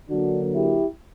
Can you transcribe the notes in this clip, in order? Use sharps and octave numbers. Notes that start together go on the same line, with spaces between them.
D3 F#3 A#3 D4 F#4
E4 G4